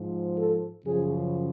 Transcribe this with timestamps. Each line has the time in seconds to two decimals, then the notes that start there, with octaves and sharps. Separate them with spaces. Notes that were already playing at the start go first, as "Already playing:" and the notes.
Already playing: G#2 F3
0.38 A4
0.86 F#2 C#3 F3 G#4